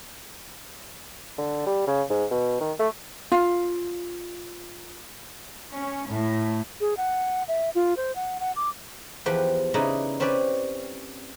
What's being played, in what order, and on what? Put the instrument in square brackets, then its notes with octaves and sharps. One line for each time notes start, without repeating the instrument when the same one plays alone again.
[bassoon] D3
G3
C#3
G#2
B2
D#3
A3
[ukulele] F4 F5
[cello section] C#4
A2
[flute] G#4
F#5
E5
F4
C5
F#5
F#5
D6
[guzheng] E2 F3 G4 B4 G5
C#3 D#4 E4 B4 D5 D#5
C4 C#4 G4 B4 D5